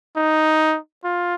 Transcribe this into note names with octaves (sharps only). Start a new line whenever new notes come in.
D#4
F4